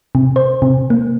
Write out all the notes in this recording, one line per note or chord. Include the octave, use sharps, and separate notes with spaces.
C3
C5
C3
A#3